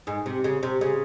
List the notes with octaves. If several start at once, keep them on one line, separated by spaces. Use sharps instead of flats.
G#2
C3
C#3
C3
C#3